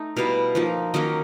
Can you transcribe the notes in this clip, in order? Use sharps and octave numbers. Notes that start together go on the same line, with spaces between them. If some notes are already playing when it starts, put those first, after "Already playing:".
Already playing: A3 D#4
B2 G3 B3 E4 F5
F3 A#3 D#4
D#3 F#3 A#3 C#4 D#5